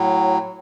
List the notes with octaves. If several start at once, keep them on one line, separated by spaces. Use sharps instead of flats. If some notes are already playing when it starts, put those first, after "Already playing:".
Already playing: A2 F#3